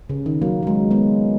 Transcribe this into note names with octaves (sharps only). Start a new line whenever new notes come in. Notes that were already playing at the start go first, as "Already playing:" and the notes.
C#3
D#3
F#3 A#3
F#3
G#3
G#3 B3